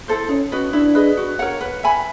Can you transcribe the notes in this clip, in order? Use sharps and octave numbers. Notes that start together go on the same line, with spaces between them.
E4 A4 C5
C#4 D#4
F#4 B4 D#5
D4 E4
G#4 B4 D#5
F#4
A#4 C#5 F#5
B4
E5 G#5 B5